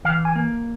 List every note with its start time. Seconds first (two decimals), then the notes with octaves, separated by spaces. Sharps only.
0.05 E3 F5
0.25 G#5
0.36 A#3